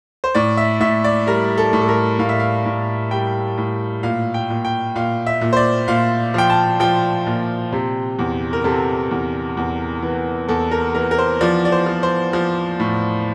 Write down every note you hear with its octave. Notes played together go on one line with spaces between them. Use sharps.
C5
A2 D5
E5
A2 E5
D5
G3 A#4
A4
A2
A4
A#4
A2 F5
E5
F5
A2
G3 G5
A2
A#2 F5
G5
A#2
G5
A#2 F5
E5
A#2
C5
D5
A#2 F5
F3 G5
A5
F3 G5
A#2
C3
E2
A#4
C3 A4
E2
E2
E3
E2 A4
A#4
E3 A#4
A#4
C5
F3 D5
D5
C5
F3
C5
F3
A2